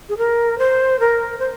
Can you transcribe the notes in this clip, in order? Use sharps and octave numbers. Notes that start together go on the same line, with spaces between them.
G#4
A#4
C5
A#4
C5